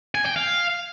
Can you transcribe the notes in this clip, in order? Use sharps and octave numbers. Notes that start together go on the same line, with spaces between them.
G#5
G5
F5